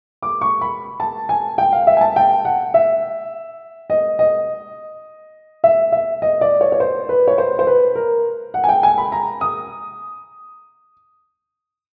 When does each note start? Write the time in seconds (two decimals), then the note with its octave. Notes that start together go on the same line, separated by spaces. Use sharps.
0.22 D6
0.41 C#6
0.61 B5
1.00 A5
1.29 G#5
1.58 G5
1.72 F5
1.87 E5
1.97 G#5
2.01 A5
2.16 G5
2.45 F#5
2.74 E5
3.90 D#5
4.19 D#5
5.64 E5
5.92 E5
6.22 D#5
6.41 D5
6.61 C#5
6.72 C#5
6.80 C5
7.09 B4
7.28 C#5
7.38 C5
7.59 C5
7.67 B4
7.95 A#4
8.54 F#5
8.64 G#5
8.69 G5
8.83 G#5
8.98 B5
9.12 A#5
9.41 D#6